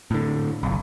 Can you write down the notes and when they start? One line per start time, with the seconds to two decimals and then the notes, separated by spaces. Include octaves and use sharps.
0.11 A2 D3
0.63 F#1 B1